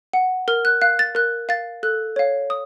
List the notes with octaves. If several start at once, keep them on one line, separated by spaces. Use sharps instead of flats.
F#5
A#4 F6
F#6
F5 F#6
A6
A#4 F#6
F5 A6
A4 F#6
C#5 F5
D#6